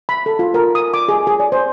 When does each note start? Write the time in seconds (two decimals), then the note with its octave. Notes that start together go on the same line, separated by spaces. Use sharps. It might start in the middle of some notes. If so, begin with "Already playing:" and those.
0.09 B5
0.26 A4
0.39 F4
0.54 A#4
0.75 D#6
0.94 D6
1.08 G#4
1.27 G#4
1.40 D5
1.52 C5